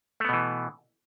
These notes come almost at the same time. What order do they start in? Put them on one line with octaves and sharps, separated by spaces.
A3 B3 B2 E3